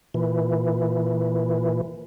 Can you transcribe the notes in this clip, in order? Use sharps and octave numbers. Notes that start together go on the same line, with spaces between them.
A#2 E3